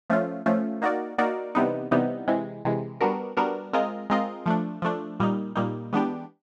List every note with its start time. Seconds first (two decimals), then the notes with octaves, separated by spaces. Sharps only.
0.10 F3 A3 C#4 F4
0.46 F3 A3 C#4 F4
0.82 A#3 D#4 F#4 A#4 D5
1.18 A#3 D#4 F#4 A#4 D5
1.55 C3 E3 G3 B3 D#4
1.91 C3 E3 G3 B3 D#4
2.28 C3 E3 G#3
2.65 C3 E3 G#3
3.01 G3 B3 D4 F#4 A#4
3.37 G3 B3 D4 F#4 A#4
3.73 G#3 C4 F4 A#4 D#5
4.10 G#3 C4 F4 A#4 D#5
4.46 F3 A3 D4
4.82 F3 A3 D4
5.20 A#2 G3 A#3 D#4
5.55 A#2 G3 A#3 D#4
5.93 E3 G#3 B3 D4 G4